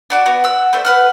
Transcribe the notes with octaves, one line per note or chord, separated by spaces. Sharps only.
D4 F#4 D6
B3 F#4
F#5 E6
A3 D4 C5 E5
B4 F#5 F6